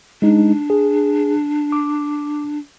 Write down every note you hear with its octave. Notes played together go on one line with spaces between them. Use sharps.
G#3 D4 D#4
G#4
D6